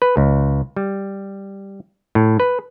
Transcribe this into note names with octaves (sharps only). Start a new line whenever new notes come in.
B4
C#2
G3
A2
B4